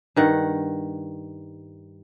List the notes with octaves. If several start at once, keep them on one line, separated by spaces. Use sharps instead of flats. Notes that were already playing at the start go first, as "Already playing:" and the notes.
G2 D#3 F#5